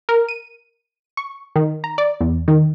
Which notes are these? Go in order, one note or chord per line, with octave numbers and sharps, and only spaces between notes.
A#4
D#7
C#6
D#3
A#5
D5
E2
D#3